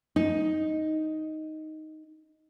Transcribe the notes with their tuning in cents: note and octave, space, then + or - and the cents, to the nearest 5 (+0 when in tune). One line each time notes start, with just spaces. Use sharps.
D#4 +5